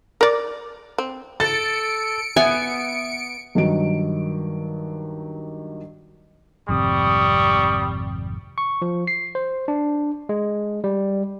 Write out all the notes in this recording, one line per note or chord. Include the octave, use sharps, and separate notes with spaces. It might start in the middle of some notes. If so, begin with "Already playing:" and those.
A#4 D5
C4
A4 A6 C#7 D7
B3 E5 G#5
G2 D#3 F#3 D7
G#1 F2 C3 G3 C#6 D#6
C#6
F3
C7
C5
D4
G#3
G3